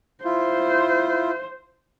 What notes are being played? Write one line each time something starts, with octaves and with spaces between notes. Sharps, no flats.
E4 F4 C5